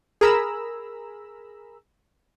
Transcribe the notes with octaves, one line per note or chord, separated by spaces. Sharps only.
G#4 A#4 A#5 B5 E6